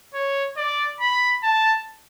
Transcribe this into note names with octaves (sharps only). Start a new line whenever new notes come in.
C#5
D5
B5
A5